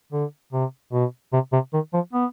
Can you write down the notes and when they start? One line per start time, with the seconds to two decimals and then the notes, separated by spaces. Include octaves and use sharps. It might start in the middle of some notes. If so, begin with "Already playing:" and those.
0.12 D3
0.53 C3
0.92 B2
1.33 C3
1.53 C3
1.73 D#3
1.94 F3
2.13 B3